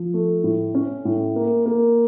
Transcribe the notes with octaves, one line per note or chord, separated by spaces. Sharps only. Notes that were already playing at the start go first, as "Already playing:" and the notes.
Already playing: F3
A3
A2
C#4
A2
A#3
A#3